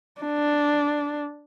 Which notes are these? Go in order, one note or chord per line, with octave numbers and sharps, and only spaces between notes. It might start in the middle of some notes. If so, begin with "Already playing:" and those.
D4